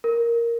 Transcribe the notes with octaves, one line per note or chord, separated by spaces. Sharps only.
A#4